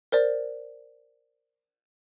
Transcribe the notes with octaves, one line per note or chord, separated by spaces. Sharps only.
A#4 C5 D5